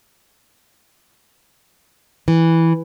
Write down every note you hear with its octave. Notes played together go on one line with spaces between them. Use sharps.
E3